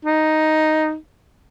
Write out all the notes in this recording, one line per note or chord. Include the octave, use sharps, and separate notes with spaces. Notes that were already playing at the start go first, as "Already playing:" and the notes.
D#4